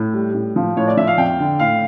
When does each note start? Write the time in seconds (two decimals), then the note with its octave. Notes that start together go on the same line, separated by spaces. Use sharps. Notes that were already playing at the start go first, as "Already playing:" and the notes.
Already playing: A2
0.13 G3
0.34 A2
0.56 F3
0.77 A2 C#5
0.87 D5
0.97 F3 E5
1.07 F5
1.18 F2 G5
1.39 D3
1.59 A2 F5